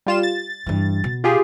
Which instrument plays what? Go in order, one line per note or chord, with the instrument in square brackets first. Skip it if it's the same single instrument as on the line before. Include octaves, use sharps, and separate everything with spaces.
[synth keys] G3 F4 E7
A6
[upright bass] G2 E3
B2
[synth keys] F4 G4 G#4